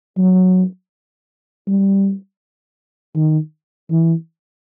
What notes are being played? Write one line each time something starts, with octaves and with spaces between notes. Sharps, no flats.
F#3
G3
D#3
E3